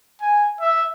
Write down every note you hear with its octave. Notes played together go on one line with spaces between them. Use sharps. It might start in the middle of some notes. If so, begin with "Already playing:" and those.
G#5
E5